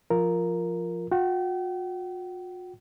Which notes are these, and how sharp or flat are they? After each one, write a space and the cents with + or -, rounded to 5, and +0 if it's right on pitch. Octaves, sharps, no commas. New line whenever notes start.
F3 +0 F4 +0 A#4 +0
F#4 -45 G5 -40